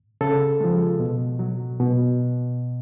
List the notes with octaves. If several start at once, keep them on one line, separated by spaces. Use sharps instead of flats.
C#3 A4
F3 G#3
B2
F#3
B2